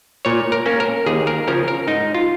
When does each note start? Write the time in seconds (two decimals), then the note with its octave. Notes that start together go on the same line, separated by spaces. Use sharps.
0.25 A#2 C#5
0.52 A#4
0.66 A#3 C#4
0.80 A#4
1.06 D#2 G#4
1.27 A#4
1.47 C#3 F3 C#4 A#4
1.68 A#4
1.87 G#2 D#4
2.14 F4